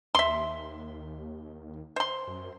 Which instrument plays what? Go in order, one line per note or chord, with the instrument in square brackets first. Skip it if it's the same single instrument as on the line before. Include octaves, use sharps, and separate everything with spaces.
[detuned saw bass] D#2 [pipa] E5 C6
[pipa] C5 C6
[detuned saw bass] F#2